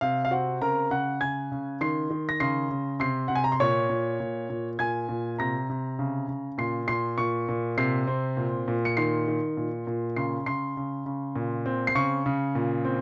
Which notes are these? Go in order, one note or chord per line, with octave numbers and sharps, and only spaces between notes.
C3 F5
F5
C4 F#4 F#5
C#3 A#4 A#5
C#3 F#5 F#6
C#3 G#5 G#6
C#3
D#3 C6 C7
D#3
A#6
C#3 C6 C7
C#3
C3 C6 C7
C3 F#5
G#5
A#5
C6
A#2 C#5 C#6
A#2
A#2
A#2
A#2 G#5 G#6
A#2
C3 A#5 A#6
C3
C#3
C#3
A#2 C6 C7
A#2 C6 C7
A#2 C#6 C#7
A#2
C3 C6 C7
C4
A#2
A#2
C#7
D#3 C6 C7
D#3
A#2
A#2
C#3 C6 C7
C#3 C6 C7
C#3
C#3
A#2
C4
C7
C#3 C#6 C#7
C#3
A#2
C4